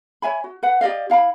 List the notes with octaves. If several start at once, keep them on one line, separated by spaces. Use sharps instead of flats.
C#5 E5 G#5 B5
F#4
B4 F#5
G4 D5 D#5 F5
E4 F5 A#5 B5